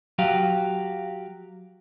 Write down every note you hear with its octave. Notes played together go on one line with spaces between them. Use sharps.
F#3 F#4 G4 F5